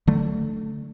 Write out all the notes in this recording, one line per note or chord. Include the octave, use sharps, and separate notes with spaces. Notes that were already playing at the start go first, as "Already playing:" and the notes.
D3 F#3 A3